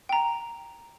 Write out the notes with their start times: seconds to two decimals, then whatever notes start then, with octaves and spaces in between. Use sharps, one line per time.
0.09 G5 A#5